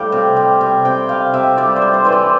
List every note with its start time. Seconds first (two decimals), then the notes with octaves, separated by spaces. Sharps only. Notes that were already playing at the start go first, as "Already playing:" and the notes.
Already playing: A2 G3 C5 F5 G5
0.12 C3
0.36 G3
0.61 C3
0.85 C3 G5
1.09 C3 F5
1.34 C3 E5
1.57 G3 D5
1.76 C5
1.82 G3
1.94 C5
2.05 E3 C5
2.12 D5